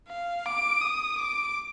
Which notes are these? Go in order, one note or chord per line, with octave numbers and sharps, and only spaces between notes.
F5
D6
D#6
D6